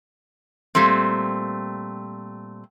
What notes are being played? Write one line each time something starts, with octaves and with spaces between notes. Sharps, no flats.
A#2 G3 A3 C4